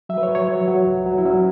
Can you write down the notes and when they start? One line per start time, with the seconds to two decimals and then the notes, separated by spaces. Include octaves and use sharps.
0.09 F#3 E5
0.17 B4
0.23 C#5
0.29 F#3
0.35 C#5
0.48 F#3
0.68 F#3
0.87 C#2
1.06 F#3
1.18 E4
1.25 F#3 C#4